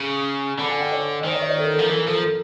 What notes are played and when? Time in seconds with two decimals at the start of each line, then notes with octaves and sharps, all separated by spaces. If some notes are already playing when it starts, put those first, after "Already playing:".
Already playing: C#3
0.58 D3 A5 B5
0.69 F#5 G#5
0.81 F5 G5
0.91 C#5 D#5
1.21 D#5
1.24 D#3 C5 D5
1.33 C#5 D#5
1.41 D5 E5
1.49 C#5 D#5
1.58 A4
1.65 A#4
1.73 A4
1.78 F3 A#4
1.89 E3 A4
1.97 A#4
2.05 F3 A4
2.13 A#4
2.21 A4